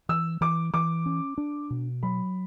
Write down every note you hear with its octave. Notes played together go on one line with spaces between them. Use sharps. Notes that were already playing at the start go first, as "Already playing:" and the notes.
E3 E6
E3 D6
E3 D6
C#4
D4
B2
F#3 B5